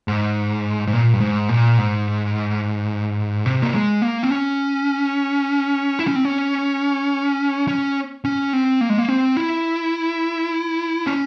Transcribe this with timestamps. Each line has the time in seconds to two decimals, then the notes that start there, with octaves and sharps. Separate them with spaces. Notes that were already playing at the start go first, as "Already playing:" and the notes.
0.08 G#2
0.87 G#2
0.93 A#2
1.13 G2
1.20 G#2
1.49 A#2
1.78 G#2
3.46 C3
3.63 A#3
3.75 G#3
4.02 A#3
4.23 C4
4.30 C#4
5.99 E4
6.07 C#4
6.16 C4
6.25 C#4
7.68 C#4
8.25 C#4
8.53 C4
8.81 A#3
8.90 G#3
8.98 A#3
9.09 C4
9.37 E4
11.07 C#4